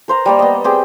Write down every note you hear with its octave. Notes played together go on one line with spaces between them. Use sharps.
A#4 C5 A#5
G3 A#3 D5
B3 D#5
C4 G4 G#4